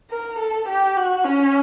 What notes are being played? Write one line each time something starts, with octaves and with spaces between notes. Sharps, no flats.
A#4
A4
G4
F#4
C#4